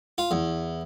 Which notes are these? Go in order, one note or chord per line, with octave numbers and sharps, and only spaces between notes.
F4
E2